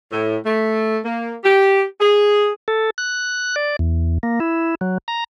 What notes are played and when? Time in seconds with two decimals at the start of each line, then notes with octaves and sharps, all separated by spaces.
0.12 A2
0.46 A3
1.05 A#3
1.44 G4
2.00 G#4
2.68 A4
2.98 F#6
3.56 D5
3.79 E2
4.23 A#3
4.40 E4
4.81 F#3
5.08 A#5